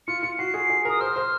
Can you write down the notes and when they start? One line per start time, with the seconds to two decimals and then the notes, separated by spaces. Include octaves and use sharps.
0.07 F4 C#7
0.22 F4 C#7
0.38 F#4 C7
0.54 G#4
0.70 G#4
0.85 A#4 D#6
1.01 C5 F6
1.16 C5